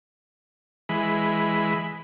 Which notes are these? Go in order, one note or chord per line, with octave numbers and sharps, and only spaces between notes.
E3 G#3 B5